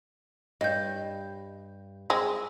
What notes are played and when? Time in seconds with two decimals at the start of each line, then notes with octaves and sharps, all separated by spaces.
0.61 G2 D#5 G6
2.10 G#3 C4